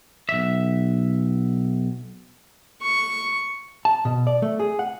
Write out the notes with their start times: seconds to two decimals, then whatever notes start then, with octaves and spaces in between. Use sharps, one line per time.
0.29 B1 E5
2.82 C#6
3.85 A5
4.05 B2
4.27 D5
4.42 A3
4.60 G#4
4.79 F#5